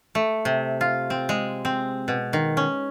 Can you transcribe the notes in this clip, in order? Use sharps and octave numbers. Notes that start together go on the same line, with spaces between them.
A3
C3
F4
C4
G#3
C4
B2
D#3
C#4